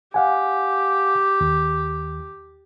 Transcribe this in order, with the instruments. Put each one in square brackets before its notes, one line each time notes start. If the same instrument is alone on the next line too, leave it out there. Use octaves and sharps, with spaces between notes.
[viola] G4 [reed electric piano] F5 F#5 G#5
[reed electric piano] D#2